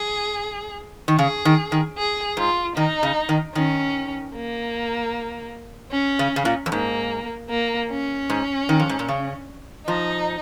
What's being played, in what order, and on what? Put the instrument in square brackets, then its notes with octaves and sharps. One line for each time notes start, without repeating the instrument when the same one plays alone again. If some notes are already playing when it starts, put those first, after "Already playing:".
Already playing: [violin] G#4
[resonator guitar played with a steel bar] D#3
[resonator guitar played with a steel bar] C#3 [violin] G#4
[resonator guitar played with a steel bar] D#3
D#3
[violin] G#4
[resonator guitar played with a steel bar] G#2 [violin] F4
[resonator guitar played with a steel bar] D#3 [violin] D#4
[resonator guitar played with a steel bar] C#3
D#3
[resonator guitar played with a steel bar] D#3 [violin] C#4
[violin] A#3
C#4
[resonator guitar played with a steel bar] C#3
C#3
A#2
F2
[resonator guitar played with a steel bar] G#2 [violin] A#3
[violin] A#3
C#4
[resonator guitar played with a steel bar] G#2
D#3
F2
G#2
A#2
C#3
[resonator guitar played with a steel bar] F3 [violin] D#4